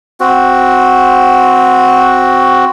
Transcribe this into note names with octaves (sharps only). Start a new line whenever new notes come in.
C4 F#4